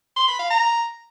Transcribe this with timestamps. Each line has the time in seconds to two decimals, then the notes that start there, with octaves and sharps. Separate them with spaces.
0.16 C6
0.28 B5
0.39 F5
0.50 A#5